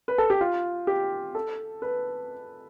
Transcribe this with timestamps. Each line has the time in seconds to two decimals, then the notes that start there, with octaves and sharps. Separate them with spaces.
0.08 B4
0.18 A4
0.30 G4
0.41 F4
0.87 G4
1.35 A4
1.82 B4